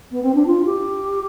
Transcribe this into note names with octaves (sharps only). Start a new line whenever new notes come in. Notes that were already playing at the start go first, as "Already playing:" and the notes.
B3
C4
D4
F4
G4